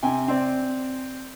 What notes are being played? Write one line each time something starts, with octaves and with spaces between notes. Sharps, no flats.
C3 G5 G#5
C4 D5